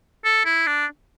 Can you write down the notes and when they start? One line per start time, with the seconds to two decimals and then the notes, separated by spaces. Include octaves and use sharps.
0.25 A4
0.45 E4
0.67 D4